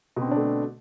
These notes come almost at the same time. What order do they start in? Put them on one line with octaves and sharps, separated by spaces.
B2 C4 D3 D4 A3